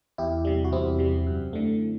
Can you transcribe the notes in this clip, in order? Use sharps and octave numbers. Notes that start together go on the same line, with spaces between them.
E2 E4 G4
C3 G3
F#4
E2 C4 E4
C3 G3
F#2
D3 A3